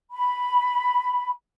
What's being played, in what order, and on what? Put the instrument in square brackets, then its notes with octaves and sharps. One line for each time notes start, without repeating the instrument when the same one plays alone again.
[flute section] B5